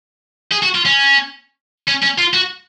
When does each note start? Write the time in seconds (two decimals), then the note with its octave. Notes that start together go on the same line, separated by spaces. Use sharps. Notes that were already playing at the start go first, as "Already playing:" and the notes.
0.52 G#4
0.63 F#4
0.75 F4
0.85 C#4
1.88 C#4
2.03 C#4
2.18 F4
2.34 F#4